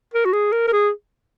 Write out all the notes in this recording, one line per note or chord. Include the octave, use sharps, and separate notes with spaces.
A#4
F#4
G#4
A#4
A#4
G#4